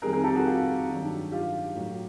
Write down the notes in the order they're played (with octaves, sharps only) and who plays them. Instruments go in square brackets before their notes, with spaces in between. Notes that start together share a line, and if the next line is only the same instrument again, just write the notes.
[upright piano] F2 C3 D#3 G3 G#4 A#4
G#4 A#4
G4 A4
F#4 G#4
F4 G4
G2 D#3 F#3
F4 G4
A2 F#3